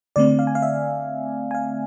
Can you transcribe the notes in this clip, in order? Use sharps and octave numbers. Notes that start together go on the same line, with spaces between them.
D3 A3 C4 D5
F5
G#5
F5
E5
G#5
F5